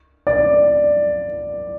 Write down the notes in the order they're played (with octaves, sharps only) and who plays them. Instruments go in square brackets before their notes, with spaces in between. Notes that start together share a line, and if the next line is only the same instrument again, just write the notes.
[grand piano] D5